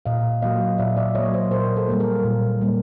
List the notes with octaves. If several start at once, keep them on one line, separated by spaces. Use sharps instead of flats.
A#2 D#5 F5
F#3 A#3 D#5 F5
A#2 D5 E5
D5 E5
F#3 A#3 C#5 D#5
C5 D5
A#2 A#4 C5
A#4
A4 B4
G3 A#3 A4
G#4 A#4
A#2
G3 A#3